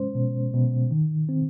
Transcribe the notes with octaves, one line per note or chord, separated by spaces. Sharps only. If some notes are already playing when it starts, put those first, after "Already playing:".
Already playing: G#3 C#4 C5
B2
B2
D#3
C4